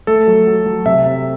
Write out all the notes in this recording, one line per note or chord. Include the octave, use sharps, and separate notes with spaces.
A3 A4
F#3
F#3
F#3
C3 E5
C3